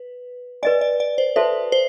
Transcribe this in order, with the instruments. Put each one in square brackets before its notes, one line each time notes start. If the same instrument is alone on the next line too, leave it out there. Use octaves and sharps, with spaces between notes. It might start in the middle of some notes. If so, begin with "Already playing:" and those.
Already playing: [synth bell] B4
[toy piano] B4 D#5 G#5 [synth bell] D5
[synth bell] D5
D5
C5
[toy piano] F#4 A4 C5 E5 A5 [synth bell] B4
[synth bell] C5